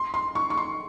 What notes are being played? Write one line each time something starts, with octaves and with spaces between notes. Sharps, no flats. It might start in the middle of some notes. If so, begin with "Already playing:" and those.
Already playing: C6
C6
C#6
C#6
C6